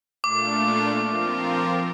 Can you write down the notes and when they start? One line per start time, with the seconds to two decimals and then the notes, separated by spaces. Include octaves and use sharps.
0.23 A#2 A3 D4 F4 D6
1.04 F3 C4 F4 A#4